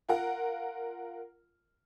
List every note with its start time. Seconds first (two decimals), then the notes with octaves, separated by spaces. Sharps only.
0.09 F4 A#4 F#5